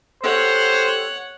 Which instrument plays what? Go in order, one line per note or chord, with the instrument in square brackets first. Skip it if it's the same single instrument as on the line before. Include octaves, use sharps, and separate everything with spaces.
[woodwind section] G4 A4 [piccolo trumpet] C5 [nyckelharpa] C#5 F#5